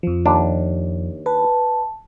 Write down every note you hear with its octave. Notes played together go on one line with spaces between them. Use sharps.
F2 F3
D#2 D4
B4 A5